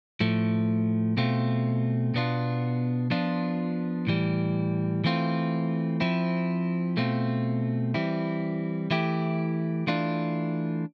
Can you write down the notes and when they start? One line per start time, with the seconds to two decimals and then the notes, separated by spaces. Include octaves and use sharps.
0.20 A2 F3 A3
1.17 B2 A3 C4 F4
2.14 B2 B3 D4 F4
3.10 F3 B3 D4 F4
4.07 A2 E3 G3
5.04 E3 A3 C4 F4
6.00 F3 C4 E4
6.97 B2 A3 C4 F4
7.94 E3 G3 C4 E4
8.91 E3 A3 E4 G4
9.87 E3 A3 D4 F4